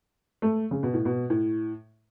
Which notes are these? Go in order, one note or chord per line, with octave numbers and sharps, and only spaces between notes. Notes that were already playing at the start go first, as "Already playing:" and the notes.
A3
C#3
B2
A2
B2
A2